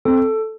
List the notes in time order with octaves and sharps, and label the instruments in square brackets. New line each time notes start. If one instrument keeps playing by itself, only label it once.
[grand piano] C4 [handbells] A4